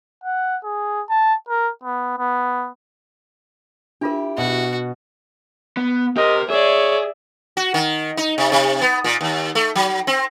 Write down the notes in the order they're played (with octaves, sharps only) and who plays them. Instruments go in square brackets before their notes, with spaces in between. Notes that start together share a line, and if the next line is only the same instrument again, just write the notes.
[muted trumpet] F#5
G#4
A5
A#4
B3
B3
[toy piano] D4 F4 A#4 [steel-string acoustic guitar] E4 G4
[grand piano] B2 [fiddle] F#4
[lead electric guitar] B3
[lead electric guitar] G4 C5 [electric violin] A#4 [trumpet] D#5
[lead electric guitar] G#4 [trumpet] C#5 [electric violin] D5 E5
[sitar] F#4
D#3
D#4
C3
C3
B3
A#2
D#2
A3
F#3
C4